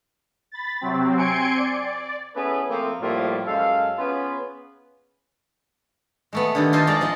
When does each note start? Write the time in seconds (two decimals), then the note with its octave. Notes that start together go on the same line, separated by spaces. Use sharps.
0.52 B5 A6
0.81 C3 F#3 C4
1.17 C4 G#5 C6 G#6 C#7 D7
1.56 D5
2.36 B3 C#4 E4 G#4 A4 B4
2.70 F3 A3 A#3 C4
3.02 A2 F3 G3 A#3 E4 F4
3.46 F#2 G#3 A4 F5
3.98 B3 C#4 F4 G#4 B4
6.33 G#3 A3 B3
6.55 D3 D#3 G4
6.72 D#4 F4 A4 C5 D#5 G#5
6.87 G#3 D5 A#5
7.01 F3 D#4 D#5